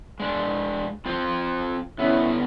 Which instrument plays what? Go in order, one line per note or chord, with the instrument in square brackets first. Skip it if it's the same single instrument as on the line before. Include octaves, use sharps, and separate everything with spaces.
[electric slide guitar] G#3 D4
C4 F4 C5
[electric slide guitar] D3 B3 [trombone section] C#4 E4